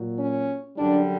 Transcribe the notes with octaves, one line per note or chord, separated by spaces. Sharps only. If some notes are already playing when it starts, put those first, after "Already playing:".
Already playing: A#2 F#3
C#4
F#2 D3 G3 D4